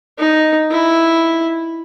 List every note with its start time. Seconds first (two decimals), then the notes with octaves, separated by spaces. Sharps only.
0.18 D#4
0.71 E4